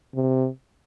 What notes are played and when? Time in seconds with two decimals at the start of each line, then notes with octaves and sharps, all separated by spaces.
0.15 C3